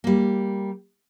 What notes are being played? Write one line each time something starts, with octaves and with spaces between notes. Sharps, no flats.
G3 A#3